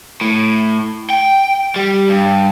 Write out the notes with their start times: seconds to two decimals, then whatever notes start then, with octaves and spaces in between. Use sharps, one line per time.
0.21 A2
1.10 G5
1.76 G3
2.09 G2